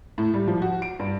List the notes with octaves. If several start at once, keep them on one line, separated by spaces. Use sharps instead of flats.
A2
G3
F3
F#4
D7
G2